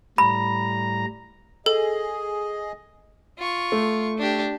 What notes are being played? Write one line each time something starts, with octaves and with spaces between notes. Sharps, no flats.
A2 G3 A#5 B5
G#4 A4 D#5
F4 C#6
A3
D4 G4